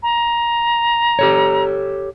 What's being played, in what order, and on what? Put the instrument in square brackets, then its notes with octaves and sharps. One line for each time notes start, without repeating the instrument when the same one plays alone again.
[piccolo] A#5
[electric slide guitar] G4 A4 C#5